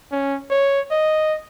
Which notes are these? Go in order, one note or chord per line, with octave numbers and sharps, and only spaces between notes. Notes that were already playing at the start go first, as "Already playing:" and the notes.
C#4
C#5
D#5